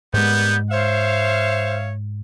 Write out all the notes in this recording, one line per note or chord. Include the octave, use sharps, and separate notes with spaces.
G#2 G3 G#3 A#3 B3 G6
C5 C#5 E5 F5